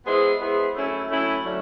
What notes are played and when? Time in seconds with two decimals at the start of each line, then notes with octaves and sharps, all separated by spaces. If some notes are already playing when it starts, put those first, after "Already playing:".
0.06 G#3 B3 E4 G#4 C5
0.40 G#3 B3 E4 G#4 C5
0.75 F#3 A3 C#4 E4
1.09 F#3 A3 C#4 E4
1.43 D3 F#3 A3 C#4